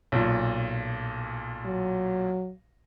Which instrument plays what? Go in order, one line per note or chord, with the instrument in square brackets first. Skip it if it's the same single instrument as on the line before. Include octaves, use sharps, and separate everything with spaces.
[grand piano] B1 A#2
[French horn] F#3